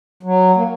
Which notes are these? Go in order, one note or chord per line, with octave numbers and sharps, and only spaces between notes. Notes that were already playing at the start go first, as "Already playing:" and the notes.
F#3
A#3